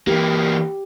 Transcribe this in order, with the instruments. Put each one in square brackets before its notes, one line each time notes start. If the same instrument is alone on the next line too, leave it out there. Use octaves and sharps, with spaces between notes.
[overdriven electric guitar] E3 A#3 [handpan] G4